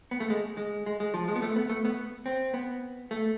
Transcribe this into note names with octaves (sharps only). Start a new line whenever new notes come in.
B3
A3
G#3
G#3
G#3
G#3
F3
G#3
B3
A3
B3
A3
B3
C4
B3
A3